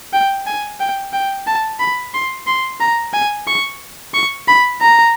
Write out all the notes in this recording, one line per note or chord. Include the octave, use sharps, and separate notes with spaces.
G5
G#5
G5
G5
A5
B5
C6
C6
A#5
G#5
C#6
C#6
B5
A#5